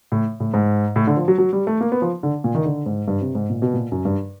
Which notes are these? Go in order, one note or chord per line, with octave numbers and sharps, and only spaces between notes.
A2
A2
G#2
A2
D3
F3
F#3
F#3
G3
A3
A#3
B3
F3
D3
A#2
D#3
D3
G#2
G2
C3
G#2
A#2
B2
A#2
F#2
G2